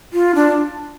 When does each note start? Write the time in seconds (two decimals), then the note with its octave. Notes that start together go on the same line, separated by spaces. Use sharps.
0.13 F4
0.35 D4